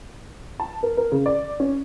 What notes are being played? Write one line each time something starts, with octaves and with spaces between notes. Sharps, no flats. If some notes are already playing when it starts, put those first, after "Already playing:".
A5
A#4
A#4
C#3
D5
C#4